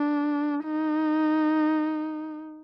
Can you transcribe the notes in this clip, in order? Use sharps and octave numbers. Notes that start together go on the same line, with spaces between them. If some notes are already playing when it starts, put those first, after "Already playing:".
Already playing: D4
D#4